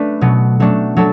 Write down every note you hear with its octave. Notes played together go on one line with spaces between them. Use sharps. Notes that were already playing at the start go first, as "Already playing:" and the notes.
Already playing: A3 D4 B4 D5
B2 F#3 B3
F#3 A3 D4
F#3 D4 A4